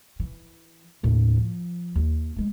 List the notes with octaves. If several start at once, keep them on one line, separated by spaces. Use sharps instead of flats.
E3
D#2 A2
F3
D#2
G#3 A3